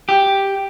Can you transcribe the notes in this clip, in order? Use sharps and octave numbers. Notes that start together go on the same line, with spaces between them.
G4